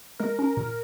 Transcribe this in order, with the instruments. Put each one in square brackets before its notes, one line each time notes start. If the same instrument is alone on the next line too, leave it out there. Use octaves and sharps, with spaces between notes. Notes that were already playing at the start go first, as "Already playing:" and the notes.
[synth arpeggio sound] G#3 [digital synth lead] A#4
[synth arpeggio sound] C#4
A#2